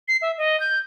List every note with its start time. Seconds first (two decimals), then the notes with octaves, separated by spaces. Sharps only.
0.08 C7
0.22 E5
0.38 D#5
0.60 G6